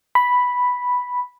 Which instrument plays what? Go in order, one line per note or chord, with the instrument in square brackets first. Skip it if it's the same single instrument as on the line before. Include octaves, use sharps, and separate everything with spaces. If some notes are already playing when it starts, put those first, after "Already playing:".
[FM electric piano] B5